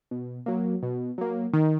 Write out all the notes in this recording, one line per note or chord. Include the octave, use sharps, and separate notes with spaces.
B2
F#3 A#3
B2
F#3 A#3
D#3